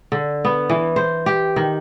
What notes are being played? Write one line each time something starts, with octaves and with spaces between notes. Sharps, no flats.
D3
B3
E3
C5
G4
D#3